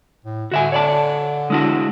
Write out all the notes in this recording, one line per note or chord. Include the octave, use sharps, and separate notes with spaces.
A2
D3 F#4 E5 G#5
C#5 D5 A5
G#3 D4 E4 F#4